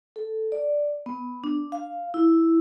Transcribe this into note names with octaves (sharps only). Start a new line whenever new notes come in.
A4
D5
B3
D4
F5
E4